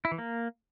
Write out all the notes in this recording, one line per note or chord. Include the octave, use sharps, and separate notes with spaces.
E4
E3
A#3